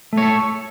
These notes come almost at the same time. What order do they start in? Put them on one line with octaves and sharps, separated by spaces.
A3 C#5 A4